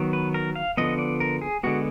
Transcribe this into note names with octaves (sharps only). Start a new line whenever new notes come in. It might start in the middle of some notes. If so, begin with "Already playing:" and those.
Already playing: D#3 F#3 B3
B4
A#4
F5
D3 F3 B3 D#5
D5
A#4
G#4
D3 G#3 B3 F#4